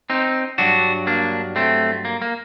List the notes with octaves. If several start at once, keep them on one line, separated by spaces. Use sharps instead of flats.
C4 D#4
G2 F#3 D4 F#4
A#3 D4
A3 C4
A#3
A#3